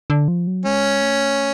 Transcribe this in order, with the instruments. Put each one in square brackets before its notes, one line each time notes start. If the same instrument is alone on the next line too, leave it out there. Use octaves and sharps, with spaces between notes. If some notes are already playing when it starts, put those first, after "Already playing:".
[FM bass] D3
F3
F#3
[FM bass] G#3 [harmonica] C#4
[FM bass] A3